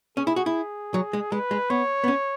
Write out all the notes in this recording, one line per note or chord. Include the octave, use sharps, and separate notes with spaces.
C#4 G#4
E4
F#4
E4
F#3
G#3
G#3 B4
G#3
B3 C#5
B3
C#4